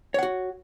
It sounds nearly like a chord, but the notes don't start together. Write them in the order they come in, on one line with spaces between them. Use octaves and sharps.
C#5 F#5 F#4